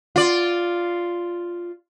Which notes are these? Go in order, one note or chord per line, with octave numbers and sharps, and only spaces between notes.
F4 D5